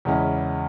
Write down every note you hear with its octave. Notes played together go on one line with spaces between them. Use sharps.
E2 C#3 G#3 C#4 E4